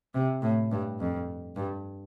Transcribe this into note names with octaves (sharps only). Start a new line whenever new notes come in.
C3
A2
G2
F2
G2